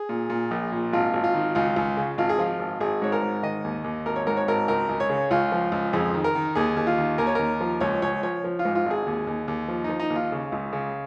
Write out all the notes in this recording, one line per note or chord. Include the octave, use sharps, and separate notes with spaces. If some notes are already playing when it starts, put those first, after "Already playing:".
Already playing: G#4
A#2
A#2
A#1
A#2
G#1 F4
G#1
F4
D#3
C#2 F4
C#2
C#3
G#1 F4
G#4
F3 F4
G#1
G#1 G#4
G#2 C#5
A#4
G#2
D#3 D#5
D#2
D#2
G#1 A#4
C#5
G#2 A#4
C#5
G#1 A#4
C#2 A#4
C#2
C#5
C#3
C#2 F4
F3
C#2
F2 G#4
D#3
A#4
D#3
D#2 G#4
D#2
F4
D#3
D#2 A#4
C#5
D#2 A#4
F3
C#2 C#5
C#2 C#5
F3 C#5
F3
F4
G#2
F4
G#1
G#4
D#2
D#2
D#2
F3
D#4
F3
D#4
D#2
F4
C#3
C#2
C#3